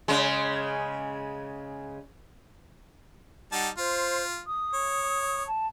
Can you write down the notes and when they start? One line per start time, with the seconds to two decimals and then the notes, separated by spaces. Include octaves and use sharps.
0.08 C#3 G#3
3.52 G3 D#4 F#5 A5
3.78 F4 C5
4.46 D#6
4.74 C#5
5.47 A5